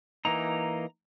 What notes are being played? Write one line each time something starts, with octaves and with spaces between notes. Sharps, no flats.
E3 A#3 D#4 A#5